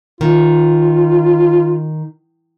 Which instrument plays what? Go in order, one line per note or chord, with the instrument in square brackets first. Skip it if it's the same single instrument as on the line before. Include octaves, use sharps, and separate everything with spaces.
[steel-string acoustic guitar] D#3 [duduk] F4